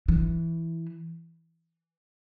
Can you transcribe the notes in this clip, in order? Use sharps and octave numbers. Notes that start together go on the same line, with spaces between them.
E3